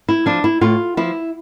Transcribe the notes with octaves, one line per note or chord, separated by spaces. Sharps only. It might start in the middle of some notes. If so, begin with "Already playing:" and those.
E4
F3 D4
E4
A2 F4
F3 E4